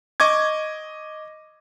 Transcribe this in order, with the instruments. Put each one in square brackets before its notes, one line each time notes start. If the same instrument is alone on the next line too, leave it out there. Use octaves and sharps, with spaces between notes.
[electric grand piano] D#5 C#6 D6 G#6